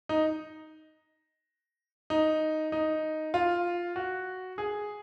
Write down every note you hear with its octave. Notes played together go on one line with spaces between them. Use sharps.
D#4
D#4
D#4
F4
F#4
G#4